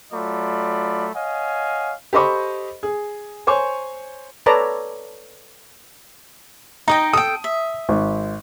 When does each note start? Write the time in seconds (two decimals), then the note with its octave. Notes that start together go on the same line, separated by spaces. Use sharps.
0.13 F#3 A3 F4 D5 B5
1.15 C#5 D#5 F5 F#5 G#5
2.13 G4 A4 C5 D#5 B5 C#6
2.83 G#4
3.47 C5 C#5 G#5 C#6
4.46 A4 B4 C#5 D5 A5 A#5
6.88 D#4 D#5 G5 A#5
7.13 A4 G5 D#6
7.44 E5
7.89 G#1